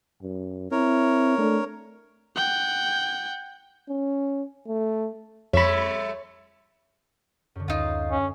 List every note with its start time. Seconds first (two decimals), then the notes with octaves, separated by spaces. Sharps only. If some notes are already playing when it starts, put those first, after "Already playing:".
0.22 F#2
0.71 C4 E4 A#4 C#5
1.38 A3 D4
2.36 F#5 G5
3.89 C#4
4.67 A3
5.53 F2 G3 A3 C#5 E5 B5
7.55 F#2 D3
7.68 D2 D#4 F4
8.11 C#4